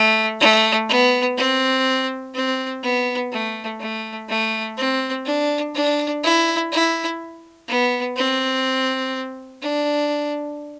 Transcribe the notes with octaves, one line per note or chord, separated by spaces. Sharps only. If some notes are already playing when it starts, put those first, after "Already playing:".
Already playing: A3
A3
B3
C4
C4
B3
A3
A3
A3
C4
D4
D4
E4
E4
B3
C4
D4